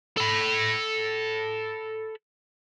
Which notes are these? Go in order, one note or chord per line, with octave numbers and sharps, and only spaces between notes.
A4 B5